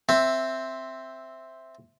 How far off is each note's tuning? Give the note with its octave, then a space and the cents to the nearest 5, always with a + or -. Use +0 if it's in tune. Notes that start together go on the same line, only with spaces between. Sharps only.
C4 +0 E5 +0